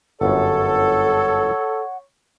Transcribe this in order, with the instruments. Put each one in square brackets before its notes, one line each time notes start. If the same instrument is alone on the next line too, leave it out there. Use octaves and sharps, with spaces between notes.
[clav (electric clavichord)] G1 F#2 [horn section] A4 [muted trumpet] C#5 [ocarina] F#5